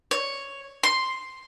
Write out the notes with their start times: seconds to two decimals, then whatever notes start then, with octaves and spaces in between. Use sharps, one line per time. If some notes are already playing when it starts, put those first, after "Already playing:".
0.11 C#5
0.83 C6